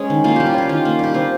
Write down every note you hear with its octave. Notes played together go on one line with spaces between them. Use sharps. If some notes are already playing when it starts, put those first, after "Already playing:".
Already playing: G#3 C#4 G#4
D#3
A#3 F4
G3 G4
F4
C#4 G4
D#3 F4
A#3
G3 G4
C4 F4